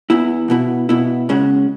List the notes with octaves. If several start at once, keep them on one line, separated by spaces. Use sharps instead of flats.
E2 E3 B3 E4
B2 B3 E4
B2 B3 E4
C#3 G#3 C#4 F#4